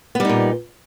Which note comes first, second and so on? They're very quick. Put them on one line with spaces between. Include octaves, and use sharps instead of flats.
B3 G3 D#4 A#2